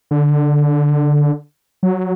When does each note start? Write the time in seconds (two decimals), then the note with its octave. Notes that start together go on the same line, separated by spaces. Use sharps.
0.11 D3
1.83 F#3